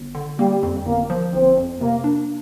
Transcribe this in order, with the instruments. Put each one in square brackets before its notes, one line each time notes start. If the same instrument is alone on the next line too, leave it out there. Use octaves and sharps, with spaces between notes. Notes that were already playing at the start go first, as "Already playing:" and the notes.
Already playing: [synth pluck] G1
D3
[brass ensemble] G3 [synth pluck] A#3
[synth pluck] F2
[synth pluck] G1 [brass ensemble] A#3
[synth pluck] F3
[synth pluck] G1 [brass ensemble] C4
[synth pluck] F2
[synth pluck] C3 [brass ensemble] A#3
[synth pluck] D4